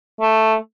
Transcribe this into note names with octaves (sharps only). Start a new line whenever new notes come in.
A3